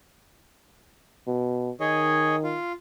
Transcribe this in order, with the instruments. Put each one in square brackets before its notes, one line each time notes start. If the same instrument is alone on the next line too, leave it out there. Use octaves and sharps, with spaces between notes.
[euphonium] B2
[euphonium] D#3 [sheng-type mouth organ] G#4 C#5 D#5
[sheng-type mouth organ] F4